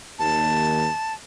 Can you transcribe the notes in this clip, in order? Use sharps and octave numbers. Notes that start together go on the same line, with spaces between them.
D#2 A5